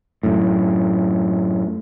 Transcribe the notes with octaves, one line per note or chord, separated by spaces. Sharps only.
F#2 A2